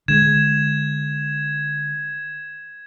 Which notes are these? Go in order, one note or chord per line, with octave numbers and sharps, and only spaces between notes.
D3 G#3 G#6 E7